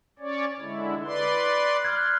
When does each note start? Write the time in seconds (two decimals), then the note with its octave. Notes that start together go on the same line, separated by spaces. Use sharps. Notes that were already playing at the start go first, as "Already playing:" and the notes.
0.19 C#4 C#5 D5
0.60 D3 G#3 E4
1.04 B4 D5 C6
1.85 F6 F#6 G#6